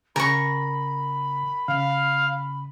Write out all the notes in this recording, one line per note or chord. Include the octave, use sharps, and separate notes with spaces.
C#3 A#4 G#5 B5 C#6
C#3 F5